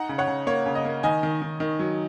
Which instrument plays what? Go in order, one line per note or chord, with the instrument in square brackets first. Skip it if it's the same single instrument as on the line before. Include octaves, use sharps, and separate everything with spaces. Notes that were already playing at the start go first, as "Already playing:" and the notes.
Already playing: [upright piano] D#4 F#5 A#5
C#3
C#5 F#5
C#3
A#3 C#5
C#3
D#5
A#3
D#3 D#5 G#5
D#3
D#3
D#3
F#3